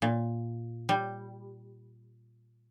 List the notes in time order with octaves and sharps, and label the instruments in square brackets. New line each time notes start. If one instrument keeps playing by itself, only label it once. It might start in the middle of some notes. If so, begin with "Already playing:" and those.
[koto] A#2
G3